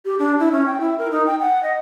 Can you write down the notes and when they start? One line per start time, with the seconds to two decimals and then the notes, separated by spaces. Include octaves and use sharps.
0.05 G4
0.19 D4
0.40 E4
0.52 C#4
0.66 G5
0.80 E4
0.98 A#4
1.11 D#4
1.26 G5
1.40 F#5
1.63 D#5